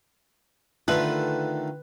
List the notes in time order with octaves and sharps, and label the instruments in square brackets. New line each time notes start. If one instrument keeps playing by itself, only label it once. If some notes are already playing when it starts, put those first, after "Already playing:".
[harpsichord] D3 A3 [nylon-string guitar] D#3 F4 [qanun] B4